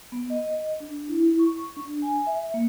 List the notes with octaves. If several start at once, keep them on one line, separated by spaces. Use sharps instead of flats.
B3
D#5
D4
E4
C#6
D4
G#5
E5
A#3